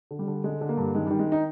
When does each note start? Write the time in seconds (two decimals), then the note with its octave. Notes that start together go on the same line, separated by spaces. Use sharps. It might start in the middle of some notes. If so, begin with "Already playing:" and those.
0.11 D3
0.19 G3
0.28 D3
0.44 D3 G#3
0.61 D3
0.69 A#3
0.77 G2
0.95 D#3 G#3
1.06 D#3 G3
1.19 G#3
1.32 D#4